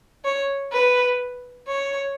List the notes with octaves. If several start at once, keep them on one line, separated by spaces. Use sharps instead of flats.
C#5
B4
C#5